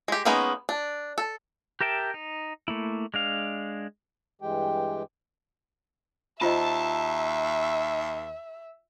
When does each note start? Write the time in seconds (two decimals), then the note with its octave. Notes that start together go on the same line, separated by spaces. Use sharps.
0.08 G#3 G4
0.25 G#3 A#3 B3 C#4 D#4
0.69 D4
1.18 A4
1.81 G4 A#4 E5 G5 A5
2.14 D#4
2.68 A3 A#3 E4
3.14 G#3 D4 F5
4.42 G2 E3 G#3 G4 G5
6.41 D#2 F4 C5 D#5 E5 A5